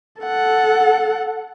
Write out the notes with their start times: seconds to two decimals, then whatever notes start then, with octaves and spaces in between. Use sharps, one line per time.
0.22 A4 F#5